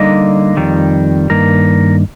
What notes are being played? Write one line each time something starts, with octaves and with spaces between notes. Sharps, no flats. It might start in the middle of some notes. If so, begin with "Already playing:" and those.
Already playing: D3 G3 A#3 D#4 D#5
F2 D#3 G3
G2 D#3 A#3 A#4